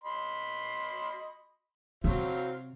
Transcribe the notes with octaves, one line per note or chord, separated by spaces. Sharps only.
D#5 B5 C6
C3 F#3 C4 F5